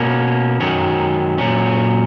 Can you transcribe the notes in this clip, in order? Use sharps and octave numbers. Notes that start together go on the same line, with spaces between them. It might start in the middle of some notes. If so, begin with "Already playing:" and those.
Already playing: B2 A#3 C#4
F#2 D#3 F#3 C#4
A#2 F#3 C#4